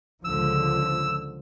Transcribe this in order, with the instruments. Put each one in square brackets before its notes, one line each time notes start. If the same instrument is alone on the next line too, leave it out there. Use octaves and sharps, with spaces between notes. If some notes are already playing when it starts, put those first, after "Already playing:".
[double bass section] C#2 D3 F3 [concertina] E6